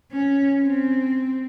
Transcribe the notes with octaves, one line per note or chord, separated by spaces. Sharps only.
C#4
C4